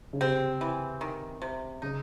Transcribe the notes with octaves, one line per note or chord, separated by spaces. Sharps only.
C#3
C3 C4
E3
D#3
C3
C#3 D#4